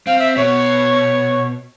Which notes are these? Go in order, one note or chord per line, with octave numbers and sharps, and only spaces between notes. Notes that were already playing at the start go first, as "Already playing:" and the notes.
C4 F5
E5
B2 C#5